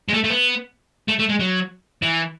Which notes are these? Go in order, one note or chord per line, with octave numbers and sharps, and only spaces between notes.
G#3
A3
A3
B3
A3
A3
G#3
F#3
E3